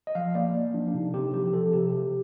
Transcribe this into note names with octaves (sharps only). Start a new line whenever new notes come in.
D#5
F3 F5
A#3 D5
A#3
F3 D4
D4
C3 D#4
C3 G4
F3 G4
G4
F3 A4
C3 G4
C3 G4